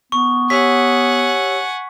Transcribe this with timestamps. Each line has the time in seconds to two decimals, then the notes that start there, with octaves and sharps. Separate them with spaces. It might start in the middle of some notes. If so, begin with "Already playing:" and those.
0.12 B3 C#6
0.50 G4 C#5 F#5 G#5 E6 B6